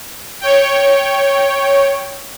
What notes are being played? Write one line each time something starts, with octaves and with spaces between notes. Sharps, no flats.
C#5 G5